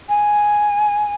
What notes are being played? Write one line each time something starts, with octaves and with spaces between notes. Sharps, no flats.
G#5